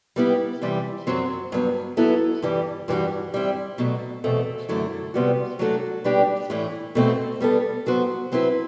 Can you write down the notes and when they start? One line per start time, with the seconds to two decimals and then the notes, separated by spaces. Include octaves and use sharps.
0.16 G3 B3 E4 G4
0.62 C3 E3 G3
1.07 F#2 F#3 C4
1.52 G2 F#3 B3
1.97 F#3 B3 E4 A4
2.42 G2 E3 G3
2.88 G2 E3 G3 D4 F#4
3.34 G3 C4 E4
3.78 B2 F#3 A3
4.24 E2 B2 A3 C4
4.69 F#2 D3 F#3 A3 E4
5.14 C3 G3 B3 F#4
5.59 F#3 A3 D4 F#4 A4
6.04 B2 G3 D4 G4 B4
6.50 A2 E3 A3 E4
6.95 B2 A3 C4
7.41 G3 B3 D4 A4
7.86 G2 F#3 B3 F#4 C5
8.32 F#3 C4 E4 B4